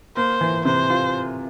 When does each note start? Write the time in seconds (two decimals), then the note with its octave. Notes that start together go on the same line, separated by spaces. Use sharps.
0.16 A#3 C5
0.41 E3
0.65 C3 C5
0.90 F4